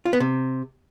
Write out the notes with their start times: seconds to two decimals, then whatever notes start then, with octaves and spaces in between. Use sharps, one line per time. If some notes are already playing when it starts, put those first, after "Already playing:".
0.05 F4
0.13 B3
0.20 C3